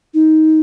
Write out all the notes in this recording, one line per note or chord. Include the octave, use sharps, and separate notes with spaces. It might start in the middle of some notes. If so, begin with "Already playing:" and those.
D#4